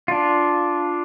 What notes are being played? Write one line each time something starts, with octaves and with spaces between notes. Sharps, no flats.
D4 F4